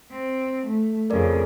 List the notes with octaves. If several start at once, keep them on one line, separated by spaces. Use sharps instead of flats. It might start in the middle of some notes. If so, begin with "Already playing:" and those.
C4
A3
F2 C#3 A#4 D5